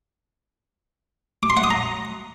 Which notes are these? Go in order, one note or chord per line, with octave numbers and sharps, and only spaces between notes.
D6
C6
F#5
D#6
A#5